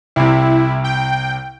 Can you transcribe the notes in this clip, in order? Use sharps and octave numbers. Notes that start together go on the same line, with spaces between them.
C2 C3 E4
G5